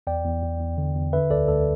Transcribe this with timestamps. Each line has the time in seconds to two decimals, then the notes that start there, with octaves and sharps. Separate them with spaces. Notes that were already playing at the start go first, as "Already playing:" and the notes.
0.07 E2 D5 G5
0.25 E2
0.43 E2
0.60 E2
0.78 D3
0.95 E2
1.13 D3 B4 E5
1.30 D2 A4 D5
1.48 D2 A4 D5